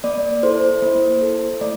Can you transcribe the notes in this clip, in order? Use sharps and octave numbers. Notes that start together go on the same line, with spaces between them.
A#3 D5
E4 A4 C5
A#3
E4 A4
A3 D5